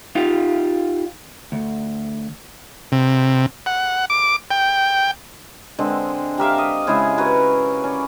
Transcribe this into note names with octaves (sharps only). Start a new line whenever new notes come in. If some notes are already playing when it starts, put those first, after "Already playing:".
D#4 F4 G4 F5
D2
C3
F#5
D6
G5
D3 G#3 C4
G4 A#4 E5 F5
D#5
C#3 G#3 E4 G#4
F#4 A#4 B4
C#4 D5